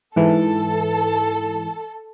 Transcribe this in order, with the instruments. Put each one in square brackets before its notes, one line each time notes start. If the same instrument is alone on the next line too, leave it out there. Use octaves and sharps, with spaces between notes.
[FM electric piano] G#2 E3 [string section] A4